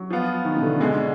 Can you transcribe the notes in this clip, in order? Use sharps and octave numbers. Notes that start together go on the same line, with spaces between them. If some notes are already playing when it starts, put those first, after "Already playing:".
Already playing: F#3
F3 B3 F4
D#3
B2
D3
D2 B2 D3 G#3